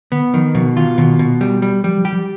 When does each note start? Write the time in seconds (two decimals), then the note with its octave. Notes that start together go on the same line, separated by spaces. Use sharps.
0.12 D3 B3
0.34 D#3 F3
0.55 B2 F3
0.76 D#3 F4
0.98 B2 D#3
1.19 B2
1.41 G3
1.62 G3
1.84 F3 G3
1.97 F3
2.05 G4
2.13 F3